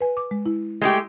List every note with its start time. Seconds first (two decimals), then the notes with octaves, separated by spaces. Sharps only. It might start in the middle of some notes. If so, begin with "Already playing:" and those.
0.01 B4 G#5
0.17 D6
0.31 G#3
0.46 E4
0.81 G#3 A3 G4